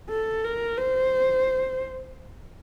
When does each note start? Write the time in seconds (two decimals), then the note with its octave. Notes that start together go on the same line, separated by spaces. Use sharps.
0.10 A4
0.45 A#4
0.78 C5